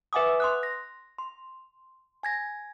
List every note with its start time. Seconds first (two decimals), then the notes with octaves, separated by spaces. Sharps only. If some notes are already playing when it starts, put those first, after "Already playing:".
0.13 B4 E5 F#5 G#5 D6 D#6
0.40 C6 D#6 F#6
0.63 A#6
1.19 C6
2.23 G#5 G#6 A#6